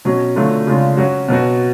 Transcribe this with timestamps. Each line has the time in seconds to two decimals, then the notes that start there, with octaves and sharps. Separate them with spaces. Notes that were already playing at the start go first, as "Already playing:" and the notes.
0.05 B2 F#3 C#4 F#4
0.36 D3 F#3 A3 F4
0.67 C#3 G#3 D4 F4
0.97 F#3 C#4 F#4
1.28 B2 F#3 B3 F#4